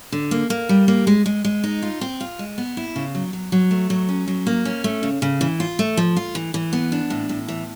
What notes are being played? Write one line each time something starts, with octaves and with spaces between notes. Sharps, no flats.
D3
A#3
A#3
G3
A#3
G#3
G#3
G#3
D#4
F4
C4
F4
G#3
B3
E4
C#3
F#3
F#3
F#3
A3
F#3
C#4
F#3
A#3
C#4
A3
C#3
C#3
E3
F4
A3
F3
F4
E3
E3
B3
D4
A2
A2
E3